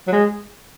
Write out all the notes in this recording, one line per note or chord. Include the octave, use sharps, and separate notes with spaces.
F#3
G#3